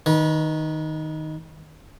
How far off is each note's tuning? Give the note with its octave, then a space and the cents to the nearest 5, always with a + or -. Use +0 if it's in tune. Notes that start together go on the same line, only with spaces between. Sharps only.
D#3 +0 B4 -30